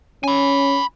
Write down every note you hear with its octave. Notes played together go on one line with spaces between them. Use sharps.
C#4 G#5 B5